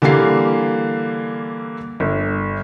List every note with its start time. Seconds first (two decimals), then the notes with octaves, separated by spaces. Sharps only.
0.02 D3 E3 G3 A#3 F5 C7
2.00 G1